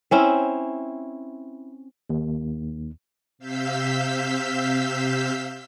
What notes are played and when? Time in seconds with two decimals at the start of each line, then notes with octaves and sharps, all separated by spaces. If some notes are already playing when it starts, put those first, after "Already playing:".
0.11 C4 C#4 E4
2.10 D#2
3.38 C3 F5 E6 G6 B6